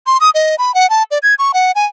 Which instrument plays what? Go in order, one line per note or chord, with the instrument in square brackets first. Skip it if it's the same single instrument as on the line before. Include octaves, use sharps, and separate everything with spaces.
[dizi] C6
D#6
D#5
B5
F#5
A5
D5
G#6
C#6
F#5
G#5